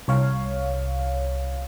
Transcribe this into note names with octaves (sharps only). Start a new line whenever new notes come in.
C2 C#5 F5